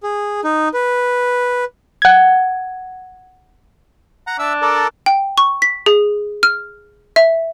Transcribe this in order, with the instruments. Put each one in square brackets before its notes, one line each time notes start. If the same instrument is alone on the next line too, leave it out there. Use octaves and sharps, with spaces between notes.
[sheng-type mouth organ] G#4
D#4
B4
[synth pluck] F#5 G#6
[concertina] F#5 A#5
[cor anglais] D4 [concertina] E5 E6
[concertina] A4 A#4 D5
[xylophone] G5
C#6
B6
G#4
F6
E5